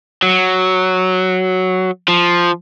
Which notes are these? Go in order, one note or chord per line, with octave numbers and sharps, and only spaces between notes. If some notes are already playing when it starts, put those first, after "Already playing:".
F#3
F3